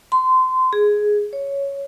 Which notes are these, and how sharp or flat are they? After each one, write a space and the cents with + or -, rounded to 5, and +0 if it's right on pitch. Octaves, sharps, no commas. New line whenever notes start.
C6 -25
G#4 +5
C#5 +5